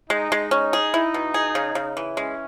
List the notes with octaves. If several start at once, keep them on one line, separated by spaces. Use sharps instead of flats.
G#3 D#4
G#3
C#4 D#4
G#4
E4
B2
G#4
C#3
C#3
E3
G#3 C#4